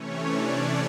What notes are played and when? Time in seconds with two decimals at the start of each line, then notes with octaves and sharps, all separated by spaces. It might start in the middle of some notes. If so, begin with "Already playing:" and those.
Already playing: C3 E3 A3 C#4 C#5
0.27 D4 D5